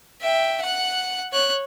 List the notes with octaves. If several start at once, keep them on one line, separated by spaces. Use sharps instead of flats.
E5 G5
F#5 F#6
C#5 F#6